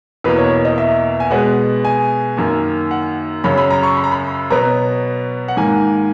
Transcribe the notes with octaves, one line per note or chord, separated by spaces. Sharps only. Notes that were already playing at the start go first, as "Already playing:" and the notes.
E2 B2 A#3 B4
C#5
D#5
E5
G#5
B2 G#3 B3 F#5
G#5
F#2 D#3 A#3
F#5
F#2 C#3 F#3 C#4 B5
B5
A#5
C#6
B5
A#5
B5
B2 F#3 B3 A#5
F#5
G#2 D#3 A#3 G#5